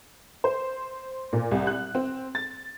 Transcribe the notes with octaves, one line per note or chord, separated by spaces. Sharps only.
C5
A#2
C2
F#6
C4
A6